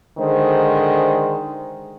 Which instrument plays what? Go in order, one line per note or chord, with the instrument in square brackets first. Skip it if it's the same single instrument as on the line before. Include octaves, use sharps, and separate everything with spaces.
[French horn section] D3 D#3 G#3 C5